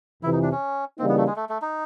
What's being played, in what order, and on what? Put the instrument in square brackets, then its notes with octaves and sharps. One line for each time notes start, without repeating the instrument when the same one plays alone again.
[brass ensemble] F2 C3 E3 [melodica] E4
[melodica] D#4
D4
C#4
[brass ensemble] C#3 E3 G3 A#3 D#4 [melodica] C4
[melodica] B3
A3
G#3
A3
A3
D#4